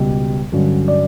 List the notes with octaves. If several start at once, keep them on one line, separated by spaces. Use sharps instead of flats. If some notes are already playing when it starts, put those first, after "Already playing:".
Already playing: C#2 B2 G3
G2 D3 F#3 C#4
D5